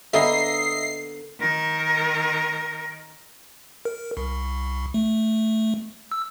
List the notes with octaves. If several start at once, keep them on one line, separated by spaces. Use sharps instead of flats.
D3 A#3 B3 D#5 E5 C7
D#3 A#4
A#4
C2
A3
E6